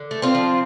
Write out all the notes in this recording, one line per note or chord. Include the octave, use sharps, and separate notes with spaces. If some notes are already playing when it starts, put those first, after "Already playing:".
Already playing: D3
A3
C4 F4
F3